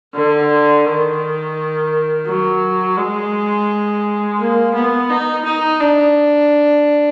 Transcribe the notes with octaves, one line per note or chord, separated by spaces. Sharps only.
D3
D#3
F#3
G#3
A#3
B3
D#4
D#4
D4